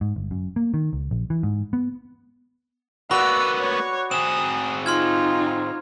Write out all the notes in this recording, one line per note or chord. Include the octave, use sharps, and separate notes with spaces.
G#2
G1
F#2
A#3
D#3
C#2
A#1
E3
G#2
B3
A#3 B3 F#4 D5 B5 E6 F#6
C#5
C4 G#4 D#6 E7
D#4 F4 C6 F6 G#6